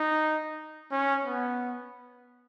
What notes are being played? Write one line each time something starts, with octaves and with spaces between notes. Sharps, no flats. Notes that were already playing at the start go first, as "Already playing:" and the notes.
Already playing: D#4
C#4
B3